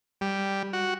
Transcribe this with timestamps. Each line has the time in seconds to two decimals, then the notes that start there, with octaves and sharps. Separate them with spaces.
0.21 G3
0.73 F#4